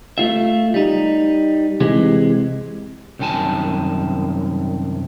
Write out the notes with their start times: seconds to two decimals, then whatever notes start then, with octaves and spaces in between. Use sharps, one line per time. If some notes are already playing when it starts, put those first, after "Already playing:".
0.18 A3 F4 E5
0.74 G3 D#4
1.80 C3 E3 G#3
3.19 C2 F#2 D#3 F#5 G#5 A5